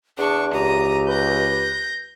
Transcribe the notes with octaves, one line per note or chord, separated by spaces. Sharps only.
E2 D4 G#4 C#6
C#2 G4 A#5 D#6
B4 G6 A#6